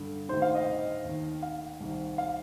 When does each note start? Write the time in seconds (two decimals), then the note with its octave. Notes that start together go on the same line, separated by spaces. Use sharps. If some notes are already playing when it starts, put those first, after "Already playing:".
Already playing: G2 D3
0.29 D2 C3 D#3 C5
0.42 F5
0.55 D#5
1.04 D#2 D#3
1.42 F5
1.80 C2 C3 D#3
2.18 F5